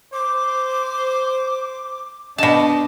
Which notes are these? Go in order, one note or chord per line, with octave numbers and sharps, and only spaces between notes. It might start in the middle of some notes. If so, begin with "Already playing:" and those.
C5 D6
B2 D4 D#5 A5